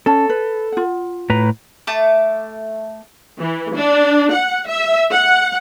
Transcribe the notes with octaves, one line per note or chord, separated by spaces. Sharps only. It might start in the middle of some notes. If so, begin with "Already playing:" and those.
C#4 A4 A5
B4
F4 F#5
A2 B4 A#5
A3 A5 D6
E3
D4
F#5
E5
F#5